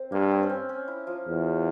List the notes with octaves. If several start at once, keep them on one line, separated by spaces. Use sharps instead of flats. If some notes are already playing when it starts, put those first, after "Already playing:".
Already playing: C4
G2 A#3
C4
C#4
C4
C#4
E4
F3 F4
E2